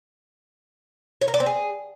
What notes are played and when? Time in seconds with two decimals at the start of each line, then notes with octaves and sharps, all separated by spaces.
1.21 C#5
1.28 A#4
1.34 D5
1.40 C4
1.46 G#4